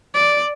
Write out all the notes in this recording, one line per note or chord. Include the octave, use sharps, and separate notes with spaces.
D5